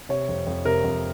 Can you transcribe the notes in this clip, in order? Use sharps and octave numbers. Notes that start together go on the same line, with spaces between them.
C3 C#5
F2
F2
C3 A#4
F2